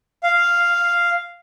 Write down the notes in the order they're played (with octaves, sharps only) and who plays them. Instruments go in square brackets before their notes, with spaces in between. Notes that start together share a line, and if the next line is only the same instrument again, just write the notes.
[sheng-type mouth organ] F5